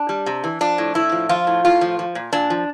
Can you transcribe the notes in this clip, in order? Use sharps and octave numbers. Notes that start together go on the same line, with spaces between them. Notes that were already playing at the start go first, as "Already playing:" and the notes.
Already playing: D4
G3
C3
E3
F3 D4
A2
A2 E4
F3
F3 F4
A2
A2 F4
F3
F3
A#2
A#2 D4
F3